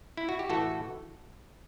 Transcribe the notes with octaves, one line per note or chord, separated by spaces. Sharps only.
E4
F#4
G4
A2 E3 A3 F#4 A4